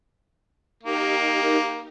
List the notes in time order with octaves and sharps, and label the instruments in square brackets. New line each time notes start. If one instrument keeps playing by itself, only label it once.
[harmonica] A#3 [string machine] D#4 G4 A#4